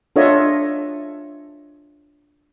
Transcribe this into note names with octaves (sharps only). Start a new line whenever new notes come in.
D4 F4 A4 C#5 D#5 E5